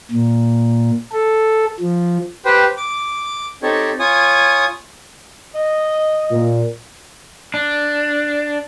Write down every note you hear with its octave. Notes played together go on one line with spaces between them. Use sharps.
A#2
A4
F3
G4 B4 C5 G5
D6
C4 D#4 G4 A4 C#5
F4 C#5 G#5 D#6
D#5
A#2
D4